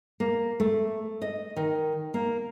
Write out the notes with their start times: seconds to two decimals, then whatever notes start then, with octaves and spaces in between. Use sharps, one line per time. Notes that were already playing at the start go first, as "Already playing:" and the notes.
0.20 A#3
0.60 A3
1.22 D#5
1.56 D#3
2.14 A#3